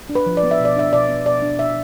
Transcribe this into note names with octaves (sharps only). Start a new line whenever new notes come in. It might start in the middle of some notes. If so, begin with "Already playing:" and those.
D4
B4
F3
D5
B3
E5
B2
D5
D4 E5
B2 D5
B3
B2 D5
D4
B2 E5